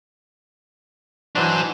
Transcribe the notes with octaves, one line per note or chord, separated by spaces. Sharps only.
E3 F#3 D4 D#4 C5